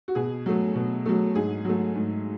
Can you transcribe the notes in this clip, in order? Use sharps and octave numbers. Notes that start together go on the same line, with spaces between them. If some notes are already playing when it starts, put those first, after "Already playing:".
F#4
B2 G#4
F#3 A3
B2
F#3 A3
G#2 G#4
F#3 A3
G#2